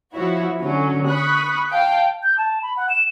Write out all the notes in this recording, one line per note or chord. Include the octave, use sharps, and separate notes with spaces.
F3 E4 F#4 C#5
D3 F#3 C#4
B5 C#6 D#6 F#6
F5 G5 A5
G6
A5
B5
F#5
E7